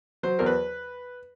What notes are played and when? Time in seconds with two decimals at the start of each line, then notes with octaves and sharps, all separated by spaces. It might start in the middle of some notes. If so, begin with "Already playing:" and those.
0.23 F#3 C5
0.39 E2 A#4
0.46 B4